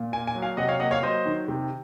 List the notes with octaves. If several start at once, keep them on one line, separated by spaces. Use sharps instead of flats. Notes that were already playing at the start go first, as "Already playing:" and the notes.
Already playing: A#2
A#3 G#5
G#5
F#3
F5 G#5
C3 D#5 F#5
C#5 F5
A#3 D#5 F#5
C#5 F5
F#3 C5 D#5
D#3
C3